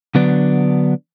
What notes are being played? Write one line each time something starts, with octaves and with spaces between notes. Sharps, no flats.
D3 F#3 B3 D4